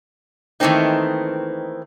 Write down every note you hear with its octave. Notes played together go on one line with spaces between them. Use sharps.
D#3 E3 A3 A#3 C4 D#4